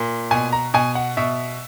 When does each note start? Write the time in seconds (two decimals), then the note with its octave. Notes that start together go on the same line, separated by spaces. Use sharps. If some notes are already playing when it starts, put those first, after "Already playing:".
Already playing: A#2
0.31 B2 G#5
0.53 A#5
0.74 B2 G#5
0.95 F#5
1.17 B2 E5